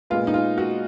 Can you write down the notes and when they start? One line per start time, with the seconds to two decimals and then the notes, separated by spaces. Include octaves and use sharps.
0.10 A#2 G#3 B3 F4
0.27 D#4
0.34 F4
0.58 F#4